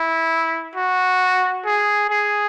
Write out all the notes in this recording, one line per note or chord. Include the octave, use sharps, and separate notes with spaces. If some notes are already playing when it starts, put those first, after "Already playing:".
Already playing: E4
F#4
G#4
G#4